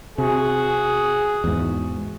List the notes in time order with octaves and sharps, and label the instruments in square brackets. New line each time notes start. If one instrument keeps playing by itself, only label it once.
[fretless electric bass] C3 [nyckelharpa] F#4 [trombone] G#4
[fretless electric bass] E2 G#2